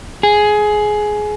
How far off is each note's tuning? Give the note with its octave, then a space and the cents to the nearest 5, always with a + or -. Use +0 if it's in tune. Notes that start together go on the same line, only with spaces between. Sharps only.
G#4 +15